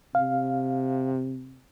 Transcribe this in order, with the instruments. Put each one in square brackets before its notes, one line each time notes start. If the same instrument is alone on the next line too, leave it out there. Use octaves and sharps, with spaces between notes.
[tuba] C3 [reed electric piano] F5